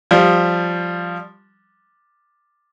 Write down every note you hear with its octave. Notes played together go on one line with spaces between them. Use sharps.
F3 G3